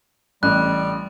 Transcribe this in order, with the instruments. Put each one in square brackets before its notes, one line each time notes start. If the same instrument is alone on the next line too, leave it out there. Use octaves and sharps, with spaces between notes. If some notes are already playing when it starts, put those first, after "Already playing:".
[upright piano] A1 [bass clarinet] G3 [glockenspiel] F#6